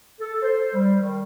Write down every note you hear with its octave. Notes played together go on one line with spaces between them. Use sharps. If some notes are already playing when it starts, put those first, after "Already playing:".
A4
C5
G3
D#3